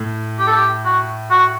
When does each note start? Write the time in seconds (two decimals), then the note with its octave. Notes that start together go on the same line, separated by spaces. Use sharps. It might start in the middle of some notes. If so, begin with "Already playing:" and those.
Already playing: A2
0.39 G4
0.47 A4
0.56 G4
0.85 F#4
1.31 F#4